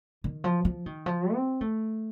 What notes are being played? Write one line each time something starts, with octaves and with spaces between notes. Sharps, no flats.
D#3
F3
F3
D#3
F3
C4
A3